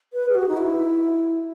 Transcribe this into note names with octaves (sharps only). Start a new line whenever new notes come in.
B4
G#4
F#4
D#4
E4